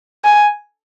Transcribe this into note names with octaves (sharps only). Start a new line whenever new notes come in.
G#5